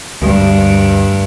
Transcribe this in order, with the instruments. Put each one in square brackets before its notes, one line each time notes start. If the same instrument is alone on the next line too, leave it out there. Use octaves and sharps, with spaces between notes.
[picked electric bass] D2 [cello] G2